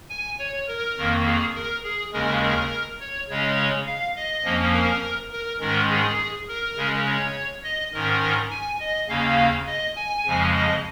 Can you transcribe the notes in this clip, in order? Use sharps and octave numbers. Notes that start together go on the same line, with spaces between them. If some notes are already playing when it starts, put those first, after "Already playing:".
G#5
C#5
A#4
F2 D#3 A#3
G#4
A#4
G#4
D#2 C#3 G#3 C#4 A#4
A#4
C#5
C#3 G#3 C#4 C#5
F5
D#5
F2 F3 A#3 C#4
A#4
A#4
G#2 D#3 G#3 C#4 A#4
G#4
A#4
C#3 G#3 C#4
C#5
D#5
G#2 D#3 C#4 A#4
G#5
D#5
D#2 C#3 A#3 C#4 F5
D#5
G#5
F2 C#3 F3 G#3
D#5